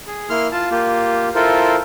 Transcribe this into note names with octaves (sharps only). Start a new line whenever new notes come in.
G#4
A#3 E4 C6 F6
F4 A5
A#3 F4 G4
E4 F4 A4 A#4 C5